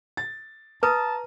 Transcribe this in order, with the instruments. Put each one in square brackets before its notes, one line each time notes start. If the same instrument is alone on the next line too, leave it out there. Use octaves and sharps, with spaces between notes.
[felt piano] A6
[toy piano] B4 [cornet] A5 [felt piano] A#5 D#6